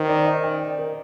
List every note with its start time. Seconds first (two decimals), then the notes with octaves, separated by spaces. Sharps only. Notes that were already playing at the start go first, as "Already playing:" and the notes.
Already playing: D#3 C5
0.08 D5
0.25 D#5
0.43 G5
0.61 D5
0.79 A#4